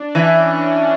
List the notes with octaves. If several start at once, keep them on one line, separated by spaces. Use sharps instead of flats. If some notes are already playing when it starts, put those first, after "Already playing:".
Already playing: D4
E3 C#4